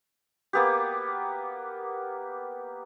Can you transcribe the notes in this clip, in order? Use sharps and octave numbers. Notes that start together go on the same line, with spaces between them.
A#3 B3 G4